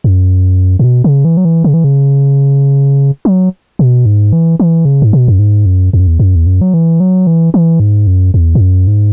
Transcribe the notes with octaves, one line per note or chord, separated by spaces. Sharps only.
F#2
G#2
B2
C#3
E3
F#3
E3
C#3
E3
C#3
F#3
B2
G#2
E3
E3
C#3
G#2
B2
F#2
G#2
F#2
E2
F#2
E2
F#2
E2
F#2
F#3
E3
F#3
E3
E3
G#2
F#2
E2
G#2
F#2
G#2